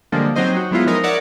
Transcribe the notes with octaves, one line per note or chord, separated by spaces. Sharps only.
D3 F3 G3 G#3 A#3 D4
F#3 C4 D#4 C5 D#5
F#4
F#3 G#3 B3 E4 F4
F3 G#3 D#4 A#4
A#4 C#5 D5 E5 F#5